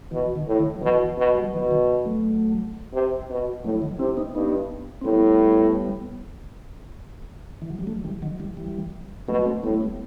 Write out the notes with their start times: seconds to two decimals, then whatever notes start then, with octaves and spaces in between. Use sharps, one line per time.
0.12 B2 E3
0.36 D#3
0.48 A2
0.59 D#3
0.76 F#3
0.82 B2 E3
1.18 B2
1.35 G3
1.45 F#3
1.53 B2 E3
1.71 D#3
2.06 F#3 A3
2.93 C3
3.30 B2
3.64 A2 F#3 A3
3.82 D#3 F#3
3.99 C3 C4 E4
4.17 B3 D#4
4.35 G2 B3 D#4
5.01 C4
5.05 A2 G3 B3
7.62 E3
7.70 F#3
7.79 G3
7.87 F#3 A3
8.04 E3 G3
8.22 D#3 F#3
8.39 E3 G3
8.57 E3 G3
9.28 B2 F#3 A3
9.45 A3 C4
9.63 A2 G3 B3
9.74 A3
9.81 G3 B3